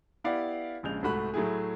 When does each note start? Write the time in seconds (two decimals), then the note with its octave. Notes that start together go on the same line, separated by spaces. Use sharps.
0.24 B3 E4 G4 D5 F5 F#5
0.83 A#1 C#3 G#3 G6 F7
1.02 C2 G#2 A3 F#4 B5 F#6
1.34 A2 F#3 A3 E4 G#4